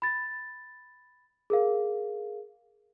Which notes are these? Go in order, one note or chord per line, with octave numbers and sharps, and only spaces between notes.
B5 A6
G#4 A#4 F5